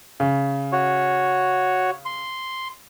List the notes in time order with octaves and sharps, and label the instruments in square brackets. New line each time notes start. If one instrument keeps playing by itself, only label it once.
[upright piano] C#3
[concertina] F#4 C#5
C6